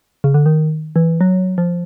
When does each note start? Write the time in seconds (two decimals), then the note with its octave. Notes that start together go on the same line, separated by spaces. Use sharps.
0.24 C#3
0.34 D3
0.46 D#3
0.96 E3
1.21 F#3
1.58 F3